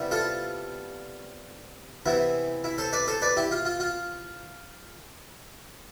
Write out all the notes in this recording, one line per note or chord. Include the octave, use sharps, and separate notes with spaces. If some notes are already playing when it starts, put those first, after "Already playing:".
Already playing: C3 G3 B3 E4
F4 A4
C3 E3 B3 E4
E4
A4 C5
B4 D5
A4 C5
B4 D5
E4 G4
F4
F4
F4